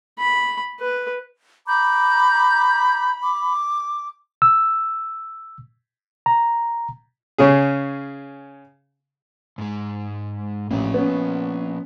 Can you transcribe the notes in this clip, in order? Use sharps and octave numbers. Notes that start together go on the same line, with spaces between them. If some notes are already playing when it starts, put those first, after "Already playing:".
B5
B4
A#5 B5 D6 G6
D6
E6
A#5
C#3 C#4 G#4
G#2 G#3
A1 F3 A#3
B3 C#4